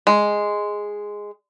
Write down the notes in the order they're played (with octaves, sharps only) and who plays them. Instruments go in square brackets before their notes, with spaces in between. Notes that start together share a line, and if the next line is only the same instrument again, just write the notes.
[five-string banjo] G#3